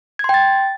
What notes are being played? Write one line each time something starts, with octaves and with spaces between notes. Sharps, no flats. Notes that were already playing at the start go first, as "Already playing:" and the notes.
G5 C6 G#6 A6